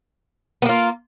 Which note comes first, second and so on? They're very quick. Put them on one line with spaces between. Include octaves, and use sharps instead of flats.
B3 A#3 F4